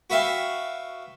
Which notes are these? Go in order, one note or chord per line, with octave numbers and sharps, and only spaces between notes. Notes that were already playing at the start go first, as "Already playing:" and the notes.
F#4 B4 E5 F5 G5